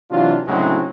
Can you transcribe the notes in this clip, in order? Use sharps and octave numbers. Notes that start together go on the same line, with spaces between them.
C3 E3 F#3 D4 F4
D2 A2 C#3 F#3 G#3 C4